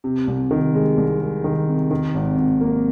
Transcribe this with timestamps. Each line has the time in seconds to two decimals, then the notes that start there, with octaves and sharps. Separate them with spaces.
0.04 C3
0.27 C2
0.51 D#3
0.74 G#3
0.98 C2
1.20 G#3
1.44 D#3
1.68 C3
1.91 D#3
2.15 G#1
2.37 G#1
2.61 A#3